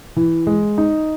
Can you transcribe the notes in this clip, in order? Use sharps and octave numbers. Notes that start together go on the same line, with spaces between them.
E3
G#3
D#4